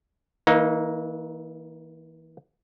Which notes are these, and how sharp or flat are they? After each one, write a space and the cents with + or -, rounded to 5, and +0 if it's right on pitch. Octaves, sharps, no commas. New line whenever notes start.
E3 -30 A#3 +0 D#4 +5